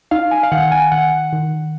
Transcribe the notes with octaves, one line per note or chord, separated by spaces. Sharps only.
D#4 F5
G#5
F5
D#3 F#5
G#5
D#3 F#5
D#3